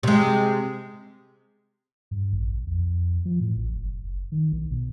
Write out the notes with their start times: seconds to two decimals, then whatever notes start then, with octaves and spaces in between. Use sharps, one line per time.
0.03 C3 G#3
2.11 G2
2.33 A1
2.52 B1
2.67 F2
3.25 F3
3.40 A2
3.57 A1
3.75 F#1
4.03 F#1
4.32 D#3
4.52 B1
4.71 B2